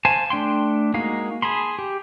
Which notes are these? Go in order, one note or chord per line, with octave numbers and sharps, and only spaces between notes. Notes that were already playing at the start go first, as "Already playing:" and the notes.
C5 F5 G#5 A5
A3 D4 G5 C6
G#3 A#3 D#4 F#4 F5
G#4 A5 B5 C6
G4